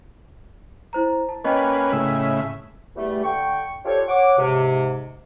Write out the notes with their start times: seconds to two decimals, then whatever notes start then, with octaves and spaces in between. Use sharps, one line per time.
0.93 E4 C5 A#5
1.29 A5
1.44 A#3 C#4 B4 D#5 G5
1.92 A2 C#3 E5
2.96 E2 G3 A3
3.23 D3 G5 C#6
3.85 D4 F4 G4 A4 C5 C#5
4.08 C#5 F#5 D6
4.38 G#2 C3